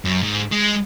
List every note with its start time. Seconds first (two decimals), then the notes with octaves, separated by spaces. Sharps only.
0.05 F#2
0.23 G#2
0.51 G#3